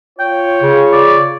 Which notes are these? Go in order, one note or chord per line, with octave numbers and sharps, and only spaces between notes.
F4 C#5 G5
C#3
D5